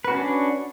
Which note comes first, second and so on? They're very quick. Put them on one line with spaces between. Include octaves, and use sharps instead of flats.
B4 F#4 C#4 D4